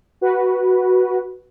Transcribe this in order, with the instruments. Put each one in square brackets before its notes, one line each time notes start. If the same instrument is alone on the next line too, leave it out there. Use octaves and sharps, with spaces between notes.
[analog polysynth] F#4 B4